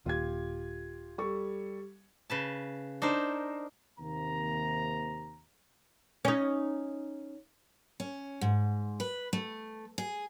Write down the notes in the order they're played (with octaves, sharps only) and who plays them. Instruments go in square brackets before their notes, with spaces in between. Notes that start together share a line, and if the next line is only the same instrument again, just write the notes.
[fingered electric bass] D#1 D#2 A#2 [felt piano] F4 G4 G#6
[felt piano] G3 A4 C#6
[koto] C#3 B4 A5
D4 D#4 A#4 C5
[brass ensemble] D#2 C3 A#3 A#5
[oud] C#4 D#4
[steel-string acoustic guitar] C#4
G#2
B4
A3
G#4